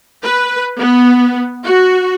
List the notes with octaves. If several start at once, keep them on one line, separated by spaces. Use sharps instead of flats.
B4
B3
F#4